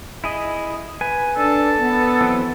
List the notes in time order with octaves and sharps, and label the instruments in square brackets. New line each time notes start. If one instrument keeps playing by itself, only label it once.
[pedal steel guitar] E4 G#4 D#5
B4 G#5
[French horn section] D4 [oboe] A4
[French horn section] B3
[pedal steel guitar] E3 F#3 C4